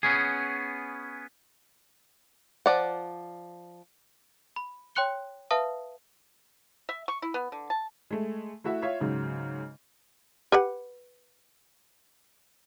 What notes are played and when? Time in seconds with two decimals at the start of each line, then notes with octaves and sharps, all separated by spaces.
0.03 B3 C#4 G#4
2.66 F3 D5 F#5
4.56 B5
4.95 C#5 G5 C6 F#6 C#7 G7
5.51 B4 E5 F5 A5 D#6
6.89 E5
7.08 C#6
7.22 E4
7.34 B3
7.52 D3
7.70 A5
8.11 G#3 A3
8.64 A3 E4 F#4 E5
8.82 F4 C#5 E5 F5
9.00 G#2 C#3 F#3
10.52 G4 B4 F#5